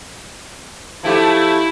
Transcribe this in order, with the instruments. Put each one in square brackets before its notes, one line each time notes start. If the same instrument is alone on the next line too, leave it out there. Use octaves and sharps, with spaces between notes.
[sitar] F3 A3 G4 [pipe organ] E4